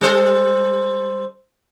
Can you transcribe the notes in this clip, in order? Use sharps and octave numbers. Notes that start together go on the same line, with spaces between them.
G3 A4 C5